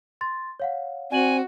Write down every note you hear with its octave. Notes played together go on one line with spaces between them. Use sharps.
C6 A6
C#5 F5 F#5
C4 F#4 D5 G#5 F#7